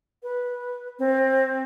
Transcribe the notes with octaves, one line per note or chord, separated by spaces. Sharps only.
B4
C4